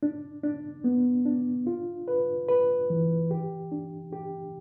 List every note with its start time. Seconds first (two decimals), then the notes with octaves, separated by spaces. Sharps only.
0.03 D4
0.43 D4
0.84 B3
1.25 D4
1.67 F4
2.08 B4
2.48 B4
2.90 E3
3.31 G4
3.72 D4
4.13 G4